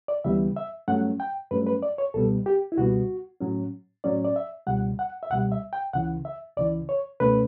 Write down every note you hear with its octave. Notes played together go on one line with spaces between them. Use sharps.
D5
D2 C#3 E3 G3 B3 E5
E5
G2 F#3 A3 C#4 F#5
G5
G2 F#3 A3 C#4 B4
B4
D5
C#5
C#2 B2 G3 B3 A4
G4
E4
C#2 B2 G3 B3 F#4
A2 F#3 C#4
A2 F#3 C#4 D5
D5
E5
C#2 B2 G3 F#5
F#5
E5
C#2 B2 G3 F#5
E5
G5
C#2 C#3 E3 F#5
E5
C#2 C#3 E3 D5
C#5
C#2 B2 A3 C#4 B4